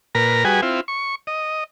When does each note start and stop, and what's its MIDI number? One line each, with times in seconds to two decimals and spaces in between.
0.15 0.44 46
0.15 0.44 70
0.15 0.44 71
0.15 0.44 82
0.45 0.61 55
0.45 0.61 66
0.45 0.61 68
0.45 0.61 71
0.45 0.61 80
0.62 0.81 60
0.62 0.81 64
0.62 0.81 65
0.88 1.15 85
1.27 1.64 75